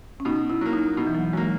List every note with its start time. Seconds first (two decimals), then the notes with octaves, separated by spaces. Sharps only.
0.20 C#4
0.25 B2 D#4
0.50 E4
0.61 F#3 A#3
0.73 D#4
0.97 B2 D#4
1.07 E3
1.15 F#3
1.33 F#3 G#3 A#3